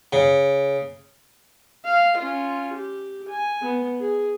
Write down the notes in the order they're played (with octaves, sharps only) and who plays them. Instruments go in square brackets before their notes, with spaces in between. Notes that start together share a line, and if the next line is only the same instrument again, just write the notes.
[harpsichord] C#3
[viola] F5
C#4 F4
G4
G#5
B3
G#4